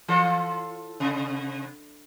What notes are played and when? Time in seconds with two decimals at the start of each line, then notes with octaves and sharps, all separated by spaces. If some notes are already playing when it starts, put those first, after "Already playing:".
0.08 E3 F4 A4
1.00 C3